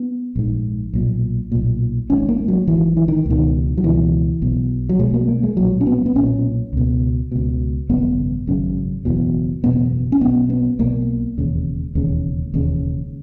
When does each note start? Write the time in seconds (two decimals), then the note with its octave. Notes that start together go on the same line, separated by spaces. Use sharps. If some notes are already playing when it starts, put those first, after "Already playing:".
Already playing: B3
0.36 A#1 G#2
0.94 B1 A#2
1.52 B1 A#2
2.10 G#1 G#2 C#4
2.29 A#3
2.48 F#3
2.67 G#1 G#2 E3
2.97 E3
3.08 D#3
3.26 C#2 B2 D#3
3.78 F#3
3.84 C#2 B2 E3
4.42 B1 B2
4.89 F#3
4.99 B1 B2 G#3
5.14 A#3
5.28 A#3
5.43 G#3
5.57 B1 A#2 F#3
5.81 C#4
5.87 B3
6.06 B3
6.15 B1 A#2 C#4
6.73 C#2 B2
7.32 C#2 B2
7.89 G#1 F#2 C#3 B3
8.47 G#1 F#2 C#3
9.05 F#1 E2 B2
9.64 F#1 E2 B2 B3
10.12 C#4
10.21 B1 B2 B3
10.50 B3
10.79 B1 B2 A#3
11.38 E1 D#2 C#3
11.95 E1 D#2 C#3
12.54 E1 D#2 C#3